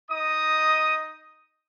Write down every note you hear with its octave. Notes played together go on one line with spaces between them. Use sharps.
D#4 D#5 D#6